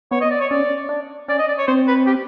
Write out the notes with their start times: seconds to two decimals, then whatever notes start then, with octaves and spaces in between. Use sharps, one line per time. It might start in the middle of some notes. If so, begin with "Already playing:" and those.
0.11 B3 C#5
0.21 D#5
0.31 D5
0.41 C#5
0.51 C#4 D5
0.89 D4
1.28 C#4 D5
1.39 D#5
1.48 D5
1.58 C#5
1.67 C4 C5
1.88 B4
2.07 G4